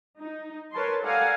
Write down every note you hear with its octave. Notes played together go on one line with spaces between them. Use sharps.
D#4
A#4 B4 C#5 A5 C6
A4 D5 F5 F#5 G#5 A#5